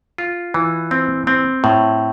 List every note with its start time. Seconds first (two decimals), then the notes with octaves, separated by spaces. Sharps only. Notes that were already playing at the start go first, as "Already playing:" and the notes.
0.18 F4
0.54 E3
0.91 C4
1.27 C4
1.64 A2